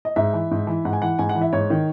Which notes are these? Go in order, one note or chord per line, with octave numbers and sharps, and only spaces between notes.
D#5
G#2 E5
E3
G#2
E3
G#2 F#5
G#5
E3 F#5
G#2 G#5
F#5
E3
E5
G#2 C#5
D#3